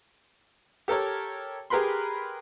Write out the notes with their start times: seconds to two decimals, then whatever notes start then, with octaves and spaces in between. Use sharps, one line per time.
0.88 G4 A4 A#4 C#5
1.70 G4 G#4 A#4 B4 B5 C6